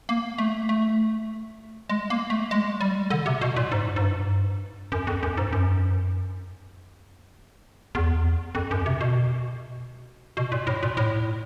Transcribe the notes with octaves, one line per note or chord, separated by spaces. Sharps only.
A#3
A3
A3
G#3
A#3
A3
G#3
G3
D3
C3
B2
A#2
G#2
G#2
G2
F#2
F2
F#2
G#2
F#2
E2
F2
F#2
C3
B2
B2
A#2
A2
A#2
A2